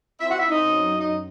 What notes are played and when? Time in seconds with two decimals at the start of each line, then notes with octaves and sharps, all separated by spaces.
0.20 C4 E4 E5
0.30 F#4 F#5
0.39 C4 E4 E5
0.49 D#4 D#5
0.59 F#2
0.79 F#3
0.99 F#2 D#4 D#5